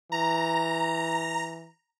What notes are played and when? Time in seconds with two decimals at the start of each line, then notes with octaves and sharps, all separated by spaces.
0.12 E3 A#5